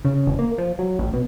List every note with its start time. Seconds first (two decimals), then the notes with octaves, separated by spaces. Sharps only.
0.05 C#3
0.27 E1
0.39 A#3
0.58 F3
0.79 F#3
0.99 A1
1.14 B2